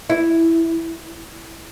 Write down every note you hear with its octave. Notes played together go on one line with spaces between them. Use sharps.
E4